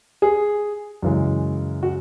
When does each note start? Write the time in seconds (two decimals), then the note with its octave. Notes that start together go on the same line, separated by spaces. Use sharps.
0.22 G#4
1.02 F#2 C#3 E3 G#3
1.83 F#4